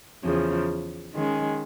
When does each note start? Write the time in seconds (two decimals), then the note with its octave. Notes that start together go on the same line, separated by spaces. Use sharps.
0.23 E2 C#3 F3
1.14 D#3 G#3 C#4